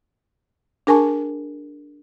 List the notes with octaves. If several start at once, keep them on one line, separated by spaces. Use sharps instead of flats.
D4 G#4 A#4 G#5 A5 C#6